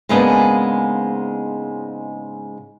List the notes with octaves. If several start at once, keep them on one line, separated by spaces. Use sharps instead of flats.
G#2 C#3 G#3 A#3 B3 D4